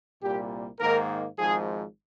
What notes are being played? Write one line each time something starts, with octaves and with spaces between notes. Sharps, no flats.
C2 A#2 G3 A#3 G4
G#2 D#3 A#3 A#4
G#1 G#2 F3 G#4